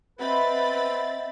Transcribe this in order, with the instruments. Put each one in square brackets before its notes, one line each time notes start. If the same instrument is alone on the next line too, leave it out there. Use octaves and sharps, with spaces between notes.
[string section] C4 B5 A6 [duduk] B4 [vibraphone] D#5 E5 F#5